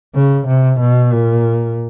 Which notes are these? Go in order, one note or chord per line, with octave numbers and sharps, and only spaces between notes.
C#3
C3
B2
A#2